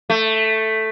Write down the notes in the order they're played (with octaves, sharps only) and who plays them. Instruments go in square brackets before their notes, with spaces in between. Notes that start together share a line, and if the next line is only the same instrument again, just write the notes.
[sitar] A3